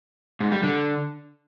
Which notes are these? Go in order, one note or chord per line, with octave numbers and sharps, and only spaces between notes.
G#2
G3
D3